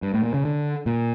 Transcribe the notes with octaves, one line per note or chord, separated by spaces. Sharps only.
G2
A2
A#2
C#3
D3
A#2